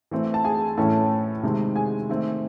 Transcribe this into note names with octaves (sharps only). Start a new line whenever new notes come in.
E3 A3 C4
A5
G#4 G#5
A2 E3 A3 C#4 A4 A5
C3 D#3 G#3 C4
G#4 G#5
D#3 A3 C4